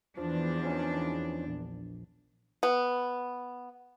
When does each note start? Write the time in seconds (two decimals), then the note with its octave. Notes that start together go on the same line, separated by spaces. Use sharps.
0.17 E2 F3 D4
0.63 F3 C#4 D#4
1.47 A#1
2.63 B3